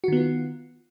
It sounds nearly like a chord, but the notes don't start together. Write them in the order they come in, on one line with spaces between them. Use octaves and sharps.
F#4 D#3 B3 F4